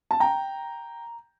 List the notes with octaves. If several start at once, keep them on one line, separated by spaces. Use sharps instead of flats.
A5
G5 A#5